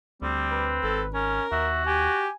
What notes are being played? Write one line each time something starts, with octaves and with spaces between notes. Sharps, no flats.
D2 G3 C4
B4
G#1 A4
C#4 A#4
D#2 F#4 E5
G4 G#5